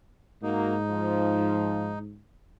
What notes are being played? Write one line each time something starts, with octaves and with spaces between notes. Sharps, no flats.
G#2 A#3 D#4 F#4
F3